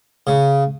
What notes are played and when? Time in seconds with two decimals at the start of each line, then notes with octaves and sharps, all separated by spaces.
0.27 C#3